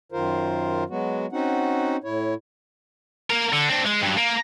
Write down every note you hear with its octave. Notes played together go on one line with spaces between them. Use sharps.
F#2 D#3 F4 A#4 C5
F#3 G#3 B3 F#4
C4 C#4 D#4 F#4 F#5
A2 E4 C#5
A#3 A#4
D3
C4 D4
G#3
G2 F#3
A#3